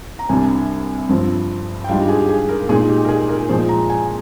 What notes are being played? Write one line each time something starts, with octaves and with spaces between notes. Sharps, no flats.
A#5
C2 C3 G3 D4 G#5
G2 F3 C4
G5
G#2 G3 D4 F4 F5
G4
G#4
G4
G#4
A#4
A#2 G#3 D#4 G#4
G4
A#4
G#4
A#4
A#2 F3 G#3 C5
A#5
G#5